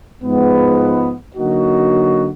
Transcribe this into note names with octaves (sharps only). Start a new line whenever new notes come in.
G#2 F3 G#3 B3
D3 F#3 A#3 D#4 F#4